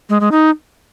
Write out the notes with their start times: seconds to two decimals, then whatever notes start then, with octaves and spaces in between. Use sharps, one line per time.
0.09 G#3
0.20 G#3
0.32 D#4